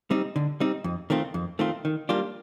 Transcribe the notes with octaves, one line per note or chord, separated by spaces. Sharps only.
G3 C4 D#4
D3
G3 C4 D#4
F2
D#3 A3 C4 F4
F2
D#3 A3 C4 F4
D#3
G3 A#3 D4 F4